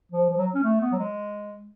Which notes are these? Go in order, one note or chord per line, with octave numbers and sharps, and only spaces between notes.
F3
F3
F#3
C#4
A3
B3
F#3
G#3